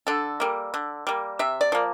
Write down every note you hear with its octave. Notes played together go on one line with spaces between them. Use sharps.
D3 A4
G3 A#3
D3
G3 A#3
C3 E5
D5
F3 A#3